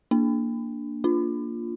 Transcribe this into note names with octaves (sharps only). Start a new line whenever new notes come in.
A#3 D4
D4 F4